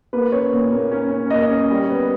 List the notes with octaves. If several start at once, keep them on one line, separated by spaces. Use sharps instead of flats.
A#3 B4
C#4 C#5
A#2
A#3
C#4
C#4
A#3 D#5
C#4
G3
B3